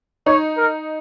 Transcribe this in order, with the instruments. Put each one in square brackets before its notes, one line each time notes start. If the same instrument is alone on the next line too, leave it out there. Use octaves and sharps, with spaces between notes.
[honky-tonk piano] D#4 [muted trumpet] C#5
[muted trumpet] A#4